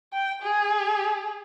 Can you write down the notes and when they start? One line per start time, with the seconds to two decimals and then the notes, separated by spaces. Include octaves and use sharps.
0.13 G5
0.42 G#4